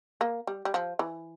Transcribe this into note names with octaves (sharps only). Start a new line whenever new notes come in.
A#3
G3
G3
F3
E3